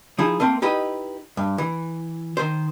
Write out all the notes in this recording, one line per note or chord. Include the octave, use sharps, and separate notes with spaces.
F3 D#4 E4 G#4
A3 A#3 C4
D#4 E4 G4 B4 D#5 B5
G2
E3
D#3 C5